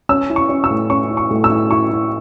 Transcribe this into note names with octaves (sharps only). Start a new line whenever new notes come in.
C#4 E6
E4
C#6
C#4
E6
A2
C#4 C#6
E4
C#6
A2
E6
E4
E4 C#6
E4